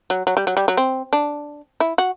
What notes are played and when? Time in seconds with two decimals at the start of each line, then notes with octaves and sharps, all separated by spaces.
0.10 F#3
0.27 F#3
0.37 G3
0.47 F#3
0.57 G3
0.68 F#3
0.77 C4
1.13 D4
1.80 E4
1.98 F#4